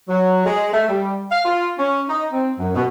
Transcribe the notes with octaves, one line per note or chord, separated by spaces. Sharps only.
F#3
G#3
A3
G3
F5
F4
C#4
D#4
C4
F#2
B2